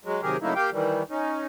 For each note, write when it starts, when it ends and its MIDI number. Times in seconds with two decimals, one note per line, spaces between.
0.05 0.21 54
0.05 0.21 56
0.23 0.37 48
0.23 0.37 51
0.23 0.37 54
0.23 0.37 67
0.23 0.37 68
0.23 0.37 70
0.42 0.54 49
0.42 0.54 54
0.42 0.54 57
0.42 0.54 58
0.42 0.54 63
0.42 0.54 64
0.56 0.70 58
0.56 0.70 67
0.56 0.70 77
0.56 0.70 79
0.72 1.03 51
0.72 1.03 52
0.72 1.03 55
1.10 1.47 61
1.10 1.47 63